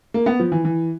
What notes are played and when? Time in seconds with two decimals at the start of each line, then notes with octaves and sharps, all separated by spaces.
0.14 A#3
0.26 B3
0.40 F3
0.52 E3
0.65 E3